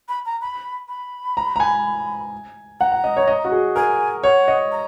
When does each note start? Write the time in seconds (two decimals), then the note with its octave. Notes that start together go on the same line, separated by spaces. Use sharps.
0.09 B5
0.26 A#5
0.41 B5
0.88 B5
1.37 A#5
1.56 A#5
1.60 G#5
2.80 F#5 A#5
2.92 F#5
3.04 D#5
3.17 C#5
3.28 D#5
3.45 F#4
3.52 G#4
3.76 A#4 G#5
4.23 C#5 F#5
4.48 D#5
4.72 A#5